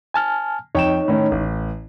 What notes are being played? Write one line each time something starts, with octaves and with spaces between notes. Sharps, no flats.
G#5 A5 F6
F2 D#4 C#5 G5 E7
A2 D#3 C#4
A1